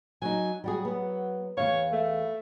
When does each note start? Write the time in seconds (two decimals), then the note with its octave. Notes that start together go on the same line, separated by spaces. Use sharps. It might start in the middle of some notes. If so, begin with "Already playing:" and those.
0.22 F#3 D#4 G#5
0.64 F#3 G3 F#4 G#4
0.85 B3
1.57 E2 D#3 C#5 F5
1.92 A3